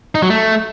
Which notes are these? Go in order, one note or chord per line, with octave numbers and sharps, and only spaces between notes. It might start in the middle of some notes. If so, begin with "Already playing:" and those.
D#4
F#3
A3